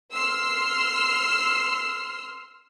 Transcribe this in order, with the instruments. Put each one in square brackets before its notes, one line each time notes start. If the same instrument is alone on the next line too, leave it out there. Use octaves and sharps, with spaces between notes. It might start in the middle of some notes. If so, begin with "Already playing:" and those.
[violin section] C6 E6 F6 C7